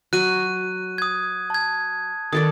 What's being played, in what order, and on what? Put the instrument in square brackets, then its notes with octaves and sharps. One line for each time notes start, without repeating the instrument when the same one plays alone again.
[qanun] F#3 [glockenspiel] F#6 D#7
[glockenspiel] D#6 G#6
A5 G#6
[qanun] D#3 A4 D5 [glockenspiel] D#6